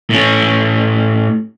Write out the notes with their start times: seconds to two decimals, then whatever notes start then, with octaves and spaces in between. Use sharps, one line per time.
0.10 A2 C#4